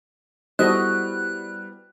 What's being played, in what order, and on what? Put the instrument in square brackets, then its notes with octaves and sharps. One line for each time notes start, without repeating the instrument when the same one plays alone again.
[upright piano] G3 [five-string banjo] B3 E4 C5 [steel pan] F#4 A4 D#5 [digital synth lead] F#6